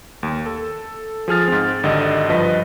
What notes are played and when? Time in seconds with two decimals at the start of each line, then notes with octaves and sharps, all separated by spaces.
0.23 D#2
0.46 A4
1.28 F3 G#4 F6 A6
1.48 G#2 C4
1.83 G#1 D3 G4 D#5
2.29 G2 F3 B4 D#5